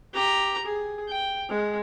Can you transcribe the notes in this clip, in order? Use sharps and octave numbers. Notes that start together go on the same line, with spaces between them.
G4 A#5
G#4
G5
G#3